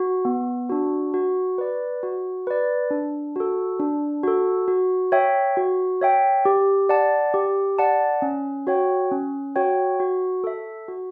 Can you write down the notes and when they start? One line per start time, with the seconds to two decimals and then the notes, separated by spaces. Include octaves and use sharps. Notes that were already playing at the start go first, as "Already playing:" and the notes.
Already playing: F#4
0.25 B3
0.69 D4 F#4
1.14 F#4
1.58 B4 D5
2.03 F#4
2.47 B4 D5
2.91 D4
3.36 F#4 A4
3.80 D4
4.23 F#4 A4
4.68 F#4
5.12 C#5 E5 G5
5.57 F#4
6.02 C#5 E5 G5
6.45 G4
6.89 D5 F#5 A5
7.34 G4
7.79 D5 F#5 A5
8.22 C#4
8.67 F#4 C#5 G5
9.11 C#4
9.56 F#4 C#5 G5
10.00 F#4
10.44 A4 E5
10.88 F#4